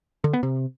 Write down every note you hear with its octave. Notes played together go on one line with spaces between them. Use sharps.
D3
B3
C3